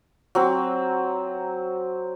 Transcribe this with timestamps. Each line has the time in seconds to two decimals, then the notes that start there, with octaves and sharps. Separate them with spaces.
0.35 F#3 C4